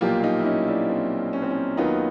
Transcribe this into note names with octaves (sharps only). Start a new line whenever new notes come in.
B1 A#2 F3 A#3 F4 G4
D#4 F4
E4
C#4 D#4
D4 E4
C4
C#4
C4
C#4
D#2 D#3 F#3 B3 D#4 F4